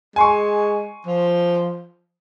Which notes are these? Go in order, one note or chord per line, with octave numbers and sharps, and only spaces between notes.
G#3 G#5 C6 C#6
F3